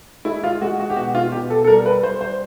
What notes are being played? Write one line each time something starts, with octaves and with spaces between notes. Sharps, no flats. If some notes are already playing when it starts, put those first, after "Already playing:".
G#3 E4
F4
G#3 F#4
F#4
G4
B2 F#4
F4
B2 G4
A4
A4
G3 A#4
B4
G3 C5
C5